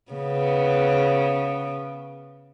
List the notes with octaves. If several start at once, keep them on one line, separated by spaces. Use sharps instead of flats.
C#3 B3